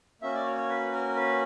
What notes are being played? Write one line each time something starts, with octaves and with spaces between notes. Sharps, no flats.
A#3 C#4 F#4 E5
D5
C#5
C#5
B4
A#4
B4